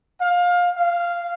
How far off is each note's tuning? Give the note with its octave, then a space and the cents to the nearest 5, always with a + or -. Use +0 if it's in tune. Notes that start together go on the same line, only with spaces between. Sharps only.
F5 +20
F5 -10